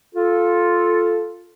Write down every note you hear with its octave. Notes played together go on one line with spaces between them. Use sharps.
F4 A4